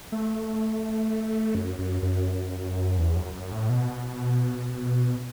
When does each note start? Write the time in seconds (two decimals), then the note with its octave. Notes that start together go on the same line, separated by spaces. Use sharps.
0.12 A3
1.55 F#2
1.79 F#2
2.03 F#2
2.98 E2
3.16 F#2
3.34 F#2
3.52 A2
3.70 B2